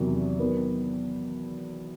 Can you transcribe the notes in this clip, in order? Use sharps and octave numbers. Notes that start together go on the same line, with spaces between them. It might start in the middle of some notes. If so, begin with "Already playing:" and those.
Already playing: E2 C3 D#3 F#3
D#3 F#3 B3